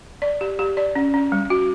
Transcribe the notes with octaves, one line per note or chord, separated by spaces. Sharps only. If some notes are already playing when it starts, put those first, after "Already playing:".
D5
G4
G4
D5
C#4
C#4
G3
F#4